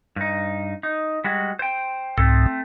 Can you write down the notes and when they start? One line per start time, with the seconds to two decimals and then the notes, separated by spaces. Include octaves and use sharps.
0.16 G2 D#4
0.83 D#4
1.24 G3 G#3 F#4
1.59 C5 G5
2.18 C2 G#2 A3 C4 A4